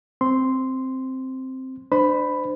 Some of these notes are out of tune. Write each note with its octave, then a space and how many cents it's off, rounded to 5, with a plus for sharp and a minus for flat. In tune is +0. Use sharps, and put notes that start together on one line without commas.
C4 +0 C6 -5
D4 +20 C5 -25 B5 +5